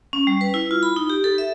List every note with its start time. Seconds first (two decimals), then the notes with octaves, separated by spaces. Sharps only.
0.13 C#4
0.27 G3
0.41 B4
0.54 E4
0.71 F4
0.83 B5
0.96 D#4
1.10 G4
1.24 A4
1.38 E5